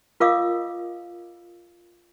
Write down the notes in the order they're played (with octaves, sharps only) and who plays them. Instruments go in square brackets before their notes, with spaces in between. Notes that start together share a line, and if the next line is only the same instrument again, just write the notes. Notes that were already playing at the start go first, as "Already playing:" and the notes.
[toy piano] F4 A#4 D#5 F5 D6 D#6